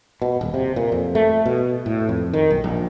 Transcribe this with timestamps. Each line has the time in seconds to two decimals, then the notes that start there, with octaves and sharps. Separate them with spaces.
0.22 B2
0.41 D#1
0.54 C3
0.76 A#2
0.92 F2
1.15 A3
1.46 B2
1.86 A2
2.09 F2
2.34 D#3
2.50 B1
2.64 A#1